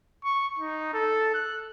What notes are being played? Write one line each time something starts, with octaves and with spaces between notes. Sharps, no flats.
C#6
D#4
A4
F#6